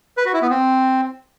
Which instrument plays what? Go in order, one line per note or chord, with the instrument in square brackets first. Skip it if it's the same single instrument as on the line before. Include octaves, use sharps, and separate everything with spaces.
[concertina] B4
F#4
E4
B3
C4